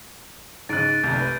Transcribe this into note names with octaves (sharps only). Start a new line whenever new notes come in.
G#2 C#3 F#6 A6 D7 D#7
F1 C2 G6
B4